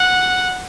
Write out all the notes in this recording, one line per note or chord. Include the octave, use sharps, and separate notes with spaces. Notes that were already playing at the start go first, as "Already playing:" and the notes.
Already playing: F#5